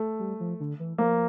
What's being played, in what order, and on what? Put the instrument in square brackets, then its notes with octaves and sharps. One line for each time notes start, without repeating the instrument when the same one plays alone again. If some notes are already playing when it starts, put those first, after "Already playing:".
Already playing: [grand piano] A3
[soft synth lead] G3
F3
D3
E3
[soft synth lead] F3 [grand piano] A#3